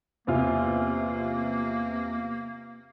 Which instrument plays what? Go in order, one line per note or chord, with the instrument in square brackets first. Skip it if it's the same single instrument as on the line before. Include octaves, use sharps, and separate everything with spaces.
[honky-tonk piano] E2 C3 F4 [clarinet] A#3